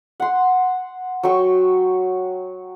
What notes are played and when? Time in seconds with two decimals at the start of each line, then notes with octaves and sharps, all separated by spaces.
0.20 F#5 C6
1.23 F#3 G5 C#6 E6